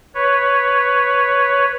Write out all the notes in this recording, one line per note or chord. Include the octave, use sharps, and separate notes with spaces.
B4 C#5